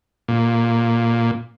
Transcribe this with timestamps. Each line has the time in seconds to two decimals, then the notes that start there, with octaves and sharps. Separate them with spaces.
0.28 A#2